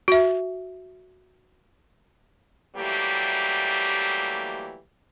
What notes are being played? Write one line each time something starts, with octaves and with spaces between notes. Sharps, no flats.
F#4 E5
E3 F#3 G3 A3 A#3 G4